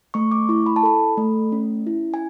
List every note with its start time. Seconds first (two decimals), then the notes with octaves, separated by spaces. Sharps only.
0.14 A3 C#6
0.31 D6
0.49 E4 C#6
0.66 B5
0.76 A5
0.83 A4 B5
1.17 A3
1.52 C#4
1.87 E4
2.14 G#5